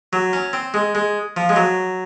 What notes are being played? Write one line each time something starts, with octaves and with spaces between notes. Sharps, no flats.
F#3
C#4
C4
G#3
G#3
F3
G#3
F#3